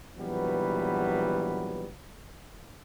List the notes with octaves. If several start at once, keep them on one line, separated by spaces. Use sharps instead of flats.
A#1 E3 F#3 G3 B3 B4